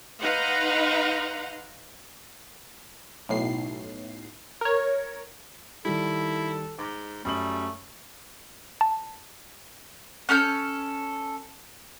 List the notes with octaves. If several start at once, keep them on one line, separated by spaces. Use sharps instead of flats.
D#4 B4 F5 F#5 A#5 C6
B1 A2 C7
A#4 C#5
D#3 G3 E4 A4
G#2 D6
F#2 G3 A3 D#6 F#7
A5
C#4 A4 F6 G6